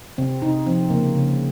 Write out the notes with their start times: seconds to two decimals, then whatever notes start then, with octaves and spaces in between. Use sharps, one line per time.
0.18 C3 C4
0.42 C3 D#4
0.66 F3 C4
0.90 C#3 A#3
1.15 C#3